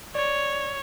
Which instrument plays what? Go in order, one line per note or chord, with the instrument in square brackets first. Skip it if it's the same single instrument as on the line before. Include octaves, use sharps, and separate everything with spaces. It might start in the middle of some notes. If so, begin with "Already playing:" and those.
[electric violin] C#5 [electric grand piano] D5